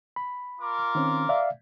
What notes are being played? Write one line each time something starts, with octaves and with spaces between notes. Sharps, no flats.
B5
F4 A#4 D6
D#3 C4 C#4
D5 E5 F5